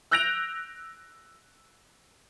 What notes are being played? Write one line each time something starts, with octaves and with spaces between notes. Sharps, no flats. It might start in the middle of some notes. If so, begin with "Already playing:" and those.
E6 F#6 G6 A#6 D7 F7